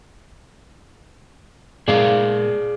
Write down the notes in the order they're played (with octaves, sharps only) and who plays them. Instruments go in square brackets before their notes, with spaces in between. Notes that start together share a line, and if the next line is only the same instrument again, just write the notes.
[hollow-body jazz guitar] A#2 G#3 A#3 [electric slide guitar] G#4 D5 F5